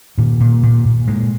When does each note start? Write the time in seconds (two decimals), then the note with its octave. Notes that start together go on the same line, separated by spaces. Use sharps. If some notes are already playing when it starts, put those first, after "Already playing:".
0.18 A#2 D#3
0.40 A#2
0.63 A#2
0.85 A#2
1.08 A#2 G#3